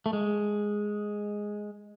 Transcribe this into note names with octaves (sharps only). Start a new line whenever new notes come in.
A3
G#3